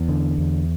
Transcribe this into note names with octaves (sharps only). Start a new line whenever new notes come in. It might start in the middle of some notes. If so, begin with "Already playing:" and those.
Already playing: E2
D3
E2